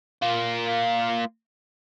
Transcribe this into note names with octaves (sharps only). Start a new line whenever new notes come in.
A#3 F4